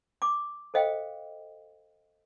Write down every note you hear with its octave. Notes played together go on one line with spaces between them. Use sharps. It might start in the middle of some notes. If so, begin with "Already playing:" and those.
D6
A4 C5 D#5 F5 G5